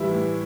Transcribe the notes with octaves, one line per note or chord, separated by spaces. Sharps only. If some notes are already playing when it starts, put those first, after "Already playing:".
Already playing: A2 E3 G3 E4 E5
A2